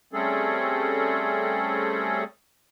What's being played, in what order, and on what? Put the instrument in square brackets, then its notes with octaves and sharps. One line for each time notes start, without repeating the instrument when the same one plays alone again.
[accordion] G3 A3 C4 C#4 G#4 A4